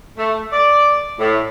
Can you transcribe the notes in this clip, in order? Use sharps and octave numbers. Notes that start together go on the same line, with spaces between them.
A3
D5
A2